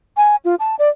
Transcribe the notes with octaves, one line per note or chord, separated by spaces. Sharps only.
G#5
F4
A5
D5